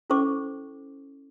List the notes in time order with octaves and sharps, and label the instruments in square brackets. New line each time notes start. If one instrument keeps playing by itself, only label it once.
[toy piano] C#4 E4 A4 C5 C#6 D6